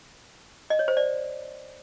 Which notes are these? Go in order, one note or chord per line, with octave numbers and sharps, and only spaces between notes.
D#5
C#5
C5
D5